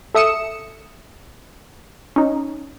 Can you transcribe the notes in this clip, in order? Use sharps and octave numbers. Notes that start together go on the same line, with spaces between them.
A4 E5 D#6 C#7 E7
C#4 D#4